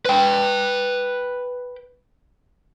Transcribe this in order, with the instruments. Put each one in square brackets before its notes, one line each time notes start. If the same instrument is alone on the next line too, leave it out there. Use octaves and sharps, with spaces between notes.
[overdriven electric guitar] B4 G5